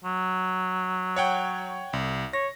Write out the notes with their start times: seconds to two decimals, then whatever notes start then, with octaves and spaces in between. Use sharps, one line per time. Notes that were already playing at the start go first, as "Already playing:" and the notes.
0.05 F#3
1.16 C#5 F#5 G5
1.93 C2
2.33 C#5 A#6